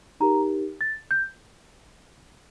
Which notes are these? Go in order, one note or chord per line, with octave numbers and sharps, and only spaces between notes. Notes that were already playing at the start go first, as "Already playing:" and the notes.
D#4 G4 A#4 A#5
A6
G6